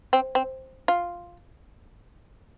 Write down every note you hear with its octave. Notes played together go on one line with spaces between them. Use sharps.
C4
C4
F4